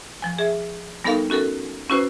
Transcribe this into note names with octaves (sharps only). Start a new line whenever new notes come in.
F3 G#5
G#4 E5
G3 B3 D#4 A4 A#4 F5
C#4 F#4 A4 A#4
C#4 E4 F#4 B4 C5